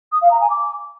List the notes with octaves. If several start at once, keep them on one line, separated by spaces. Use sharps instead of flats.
D#6
F5
A#5
G#5
D6